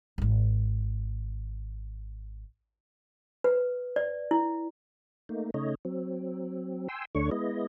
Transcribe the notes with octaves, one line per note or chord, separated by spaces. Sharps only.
D1 G#1
B4
D5
E4
A3 A#3 D#4
C#3 A3 D#4 C#5 D#5
F#3 C4
G5 G#5 C6 E6
D2 D3 A3 D4 C#5 C#6
G#3 B3 E4 D#5